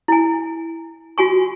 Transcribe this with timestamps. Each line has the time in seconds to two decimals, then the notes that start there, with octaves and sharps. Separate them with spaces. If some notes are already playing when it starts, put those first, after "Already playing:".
0.08 E4 G#5
1.18 F4 F#4 G#5 C#6